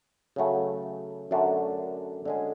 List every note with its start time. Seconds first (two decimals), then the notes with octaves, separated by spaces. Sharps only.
0.36 C#3 F#3 A3
1.31 F#2 D3 A3 D4 F#4
2.25 D3 G#3 C#4 G#4